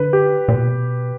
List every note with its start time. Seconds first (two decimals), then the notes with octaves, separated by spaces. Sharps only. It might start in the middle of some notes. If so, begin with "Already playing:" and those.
Already playing: D3 B4
0.13 G4
0.48 A#2
0.55 B2